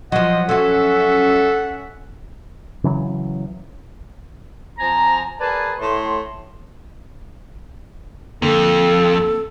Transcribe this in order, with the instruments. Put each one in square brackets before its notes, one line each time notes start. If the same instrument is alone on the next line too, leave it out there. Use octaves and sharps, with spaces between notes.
[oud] F3 F#3 [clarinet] D#5 [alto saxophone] F#5
[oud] F#3 F#4 [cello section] C#4 E5 [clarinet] A4
[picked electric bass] C#3 E3 F#3
[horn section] F3 C4 G#5 A#5
G#4 A#4 B4 D5 G#5 A5
A2 C6
[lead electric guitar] F2 [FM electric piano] D3 A#3 [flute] A4